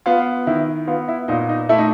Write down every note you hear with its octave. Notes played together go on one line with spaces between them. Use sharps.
B3 F4
D#3 E4
B3 F4
E4
A#2 D#4
D#4
A3 E4
D#4